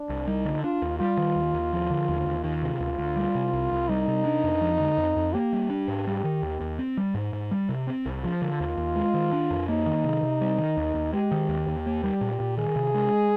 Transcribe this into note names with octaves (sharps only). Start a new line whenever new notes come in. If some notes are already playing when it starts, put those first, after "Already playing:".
Already playing: D4
C2
G3 D#4
D3
D4 F4
D#2
G3 F4
D#3
D#2
D#2
F3
D3
D#2
D#2
D#3 F4
C3
D2
D2
G3
C3
C2
C2
G3 D#4
C3
D4
F2
F3
D3
F2
F2
A#3 G4
G3
D4
G#2
G3
D#3
D#2
D#2
C4
G3
G#2
G#2
G3
C3
C4
C2
F3 F4
D3
D#2
D#2
G#3
D#3
D4
F2
A#3 D#4
D#3
C3
C3
G3
D#3
D#2
D#2
G#3 G4
D#3
D#2
D#2
A#3
G3
A#2
A#2
D#3 G#4
C3
G#3